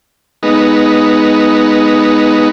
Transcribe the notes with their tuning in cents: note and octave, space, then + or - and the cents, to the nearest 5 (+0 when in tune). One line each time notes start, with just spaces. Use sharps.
G#3 +0 B3 +0 D#4 +0